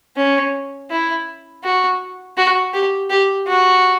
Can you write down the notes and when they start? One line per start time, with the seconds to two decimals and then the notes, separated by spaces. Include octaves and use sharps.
0.16 C#4
0.90 E4
1.63 F#4
2.37 F#4
2.73 G4
3.10 G4
3.47 F#4